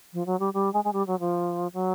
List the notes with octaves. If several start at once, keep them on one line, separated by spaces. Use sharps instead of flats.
F3
F#3
G3
G3
G#3
G#3
G3
F#3
F3
F#3